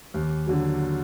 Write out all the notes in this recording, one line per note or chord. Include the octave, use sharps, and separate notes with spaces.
D#2
D3 F#3